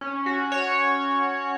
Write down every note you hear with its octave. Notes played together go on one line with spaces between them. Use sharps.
C#4
F#4
C#5